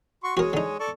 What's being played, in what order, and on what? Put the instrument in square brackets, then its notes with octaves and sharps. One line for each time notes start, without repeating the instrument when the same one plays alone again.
[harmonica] F#4 C6 C#6
[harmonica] G#3 G#4 C#5 [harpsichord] F#4 A#4
[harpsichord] D3 D#4
[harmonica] A4 D5 C#6